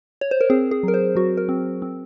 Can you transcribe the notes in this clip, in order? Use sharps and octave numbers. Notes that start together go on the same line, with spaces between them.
C#5
C5
A#4
C4 G#4
G#4
F#3 A#4
C5
F#3 F#4
A#4
C4
C4